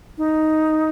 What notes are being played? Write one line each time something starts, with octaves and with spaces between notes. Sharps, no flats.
D#4